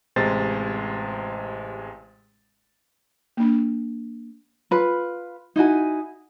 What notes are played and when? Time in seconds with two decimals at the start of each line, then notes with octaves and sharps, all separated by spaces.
0.16 A1 C3 G#3 C5 A6
3.37 A#3 D4
4.71 F4 B4
5.56 D#4 E4 F#4 G#5